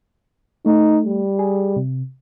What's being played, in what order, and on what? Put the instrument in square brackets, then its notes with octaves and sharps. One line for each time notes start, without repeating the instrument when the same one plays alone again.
[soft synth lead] A3 [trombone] D#4
[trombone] G3
[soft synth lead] G#4
C3